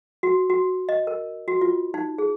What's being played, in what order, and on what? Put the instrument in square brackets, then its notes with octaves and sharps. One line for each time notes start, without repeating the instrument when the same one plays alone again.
[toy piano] F#4
F#4
D#5
A#4
F#4
F4
D#4
G#4